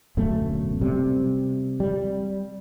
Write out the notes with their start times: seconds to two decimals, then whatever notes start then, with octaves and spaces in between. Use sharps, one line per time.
0.17 D1 F#2 B2 A3
0.81 C3 G3
1.80 G3